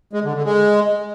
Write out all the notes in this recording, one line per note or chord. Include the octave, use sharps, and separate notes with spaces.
G#3
D3
D3
G#3